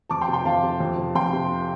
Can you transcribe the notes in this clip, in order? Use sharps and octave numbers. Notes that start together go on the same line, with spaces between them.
F2 A5 D6
G5 C6
C3
G5 C6
F2 F5 A5
C3
F2
C3
F2 G5 C6
C3